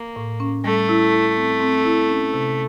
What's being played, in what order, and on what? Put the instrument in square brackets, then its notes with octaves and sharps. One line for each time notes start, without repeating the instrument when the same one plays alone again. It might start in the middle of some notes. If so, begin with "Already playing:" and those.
Already playing: [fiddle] A#3
[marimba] A2
C#4
[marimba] G3 [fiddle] A3
[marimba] E4
E4
C4
C4
E4
C#4
C3